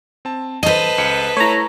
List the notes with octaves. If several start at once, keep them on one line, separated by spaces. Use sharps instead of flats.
C4 A5
A4 B4 C5 D#5 D#7
C#2 C#7
A3 E4 C#5 A#5